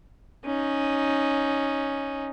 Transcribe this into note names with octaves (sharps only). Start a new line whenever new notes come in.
C#4 D#4